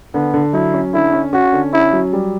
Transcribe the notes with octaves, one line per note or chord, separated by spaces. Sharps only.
D3 B3
D3
F#3 E4
C#4
D3 E4
C#4
C#4 F#4
D3
C#4 E4
F#3
G3